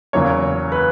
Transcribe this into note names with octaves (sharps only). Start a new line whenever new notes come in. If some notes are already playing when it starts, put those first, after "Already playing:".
E2 C#3 F#3 A#3 C#5
B4